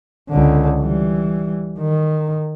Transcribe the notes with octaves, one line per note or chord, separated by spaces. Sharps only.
C#2 D3
E3 G3
D#3